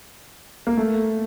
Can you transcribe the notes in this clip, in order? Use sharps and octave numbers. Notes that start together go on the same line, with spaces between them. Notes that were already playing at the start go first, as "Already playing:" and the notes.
A#3
A3